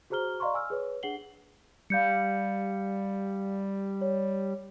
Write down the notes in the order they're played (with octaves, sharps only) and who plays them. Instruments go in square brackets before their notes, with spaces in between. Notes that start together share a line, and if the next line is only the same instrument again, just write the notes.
[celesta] F#4 G#4 C5 A#5 F6 G7
D5 D#5 F5 A#5 C6 C#6
G#5 E6 F6
G#4 B4 C#5
D4 G#4 F#5 C7 F#7 G7
[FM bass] G3 [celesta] F5 G6 C#7
[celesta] C#5